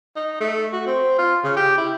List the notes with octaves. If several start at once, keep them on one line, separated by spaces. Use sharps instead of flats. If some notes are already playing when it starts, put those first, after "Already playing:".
D#4
A3
F#4
C4
F4
C#3
G4
E4